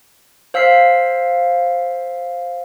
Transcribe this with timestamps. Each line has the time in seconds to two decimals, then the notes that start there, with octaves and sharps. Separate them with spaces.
0.54 C5 F5 E6 B6 C7